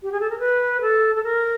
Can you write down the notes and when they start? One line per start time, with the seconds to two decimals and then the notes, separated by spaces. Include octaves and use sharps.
0.03 G4
0.12 G#4
0.20 A4
0.30 A#4
0.39 B4
0.81 A4
1.15 A4
1.24 A#4